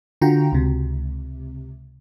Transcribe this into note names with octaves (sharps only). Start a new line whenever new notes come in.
D3 F4 F#4 G5 A#5
C#2 C3